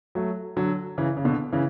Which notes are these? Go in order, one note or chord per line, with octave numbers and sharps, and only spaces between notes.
F#3 A3
D3 F#3
C#3 E3
C#3
B2 D3
C#3 E3